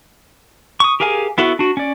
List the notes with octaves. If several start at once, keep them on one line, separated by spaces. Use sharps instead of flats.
C#6 D#6
G4 G#4 A#4 F5 G#5
B3 E4 F#4 A4
D4 F#4
C#4 D5